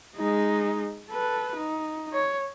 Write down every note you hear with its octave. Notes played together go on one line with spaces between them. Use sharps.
G#3 D#4
A4 B4
D#4
C#5